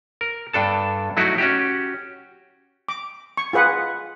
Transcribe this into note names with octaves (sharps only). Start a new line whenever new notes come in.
A#4
G2 D4 A4 A5
F#3 A3 D#4 E4 F#4
C#4 F#4 G4
D6
C#6
F4 G#4 B4 F#5